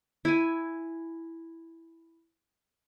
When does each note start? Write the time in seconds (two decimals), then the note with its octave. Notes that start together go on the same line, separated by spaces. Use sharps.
0.25 E4 G#5